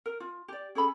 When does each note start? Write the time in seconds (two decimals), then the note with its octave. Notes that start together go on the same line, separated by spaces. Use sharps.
0.06 A#4
0.20 F4
0.48 G4 D5
0.75 C#4 G#4 A4 B5